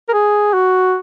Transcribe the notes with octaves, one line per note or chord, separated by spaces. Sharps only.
A#4
G#4
F#4